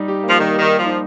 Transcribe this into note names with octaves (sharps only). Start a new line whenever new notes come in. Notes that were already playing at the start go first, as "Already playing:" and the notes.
Already playing: G3 D#4
G4
A#3
F3
D#3 G3
D#3 G4
G4
F3
D#4